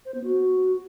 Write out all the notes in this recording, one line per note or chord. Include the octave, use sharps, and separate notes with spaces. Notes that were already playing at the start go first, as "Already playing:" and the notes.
C5
B3
F#4